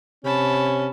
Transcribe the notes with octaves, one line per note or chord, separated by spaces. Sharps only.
C3 C#4 A5 B5